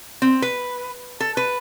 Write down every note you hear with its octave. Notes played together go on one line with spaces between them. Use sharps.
C4
B4
A4
B4